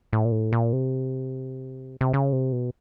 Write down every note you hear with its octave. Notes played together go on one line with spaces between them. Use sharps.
A2
A#2
A2
A#2
C3
C3
C#3
C3
B2